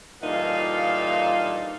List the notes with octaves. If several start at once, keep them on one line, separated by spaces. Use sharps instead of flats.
G2 A#2 E3 D#4 A4 F5